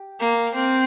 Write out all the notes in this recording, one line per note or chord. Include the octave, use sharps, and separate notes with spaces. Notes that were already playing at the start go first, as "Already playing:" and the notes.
Already playing: G4
A#3
C4 A#4